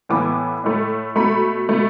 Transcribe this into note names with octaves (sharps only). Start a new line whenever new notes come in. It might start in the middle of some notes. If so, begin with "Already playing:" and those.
A2 E3 B3 D6
A2 A3
B2 A3 B5
B2 A3